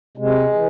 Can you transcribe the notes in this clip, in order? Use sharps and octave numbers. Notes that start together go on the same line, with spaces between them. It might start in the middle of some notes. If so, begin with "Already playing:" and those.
C3 G#3
E3